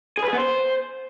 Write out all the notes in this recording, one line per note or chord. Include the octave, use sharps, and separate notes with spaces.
G#4
B4
G#4
B3
C5